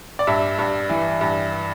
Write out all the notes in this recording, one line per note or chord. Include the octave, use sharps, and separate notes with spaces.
D5
G2 E5
G2
E3
G2